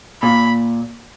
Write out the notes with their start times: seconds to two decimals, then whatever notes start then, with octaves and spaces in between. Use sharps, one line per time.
0.22 A#2 B5